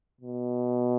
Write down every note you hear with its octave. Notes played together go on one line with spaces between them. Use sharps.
B2